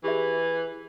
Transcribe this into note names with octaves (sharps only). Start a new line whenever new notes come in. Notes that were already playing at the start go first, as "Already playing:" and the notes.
E3 G4 G#4 E5